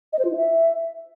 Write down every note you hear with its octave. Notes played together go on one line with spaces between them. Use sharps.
D#5
C5
F4
E4
E5